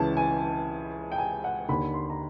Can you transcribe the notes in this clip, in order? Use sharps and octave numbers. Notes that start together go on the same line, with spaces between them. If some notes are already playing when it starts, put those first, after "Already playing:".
Already playing: C#2 C#3 E3 A5
G#5
G5
G#5
F#5
D#2 D3 B5
C6
A#5